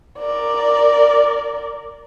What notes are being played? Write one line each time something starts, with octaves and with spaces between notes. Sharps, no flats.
A#4 D5